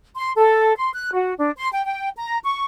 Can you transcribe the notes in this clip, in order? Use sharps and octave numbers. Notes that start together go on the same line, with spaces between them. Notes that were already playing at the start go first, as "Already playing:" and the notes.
C6
A4
C6
F#6
F#4
D4
C6
G5
G5
A#5
C#6